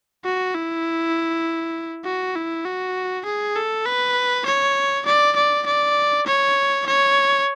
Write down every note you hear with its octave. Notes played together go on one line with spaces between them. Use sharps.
F#4
E4
F#4
E4
F#4
G#4
A4
B4
C#5
D5
D5
D5
C#5
C#5